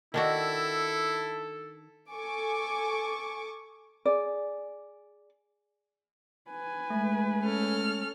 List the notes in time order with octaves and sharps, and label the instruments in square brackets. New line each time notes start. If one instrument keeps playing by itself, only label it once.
[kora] D#3 D4 F#4 [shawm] E4 [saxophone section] A4
[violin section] A4 G#5 C#6 D6
[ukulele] G#4 D5
[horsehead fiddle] B4 G#5
[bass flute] G#3 [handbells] A3
[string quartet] C#4 A4 F6